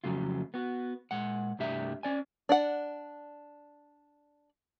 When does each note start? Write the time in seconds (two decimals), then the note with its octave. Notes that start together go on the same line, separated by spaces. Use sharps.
0.04 F2 C#3 F#3 A3 F4
0.54 B3 F#4
1.11 A#2 G#3 F#5
1.59 C2 G2 A3 D4 G4 E5
2.03 C#4 D5 G#5
2.49 D4 D5 F#5